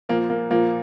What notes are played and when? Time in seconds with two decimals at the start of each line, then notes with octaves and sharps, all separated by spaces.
0.09 A#2 F3 A#3
0.30 A#3
0.51 A#2 F3 A#3